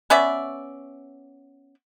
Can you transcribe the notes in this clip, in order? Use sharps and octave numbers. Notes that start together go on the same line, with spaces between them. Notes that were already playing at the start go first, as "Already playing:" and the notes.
B3 C#4 D5 E5